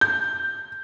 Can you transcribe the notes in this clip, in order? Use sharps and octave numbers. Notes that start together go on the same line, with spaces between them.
G6